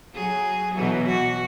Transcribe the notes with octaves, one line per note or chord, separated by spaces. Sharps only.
F#3 G#4
B2 E3 F#3
F#4